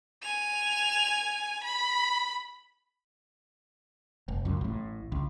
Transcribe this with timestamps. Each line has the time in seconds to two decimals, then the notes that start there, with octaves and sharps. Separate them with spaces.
0.22 G#5 F7
1.63 B5
4.28 F1
4.45 C#2 F#2
4.61 A1 A2
5.12 C#2